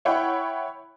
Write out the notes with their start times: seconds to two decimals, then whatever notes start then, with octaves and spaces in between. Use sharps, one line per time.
0.05 E4 C#5 F#5 G5 B5 C#6